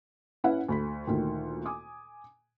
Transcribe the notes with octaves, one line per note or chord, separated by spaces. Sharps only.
C#4 E4 B4 E5 F#5
D2 B5 B6
D2 A#2 D#3
G#5 D6 D#6